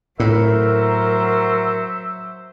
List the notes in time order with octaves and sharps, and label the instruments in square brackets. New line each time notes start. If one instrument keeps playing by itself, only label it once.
[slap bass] A2 [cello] F#3 C5 [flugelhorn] A#4 [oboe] E5